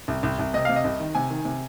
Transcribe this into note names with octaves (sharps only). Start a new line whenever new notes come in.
C2
C2
C2
C3 D#5
C3 F5
D#5
C2
D#3
C3 G#5
D#3
C3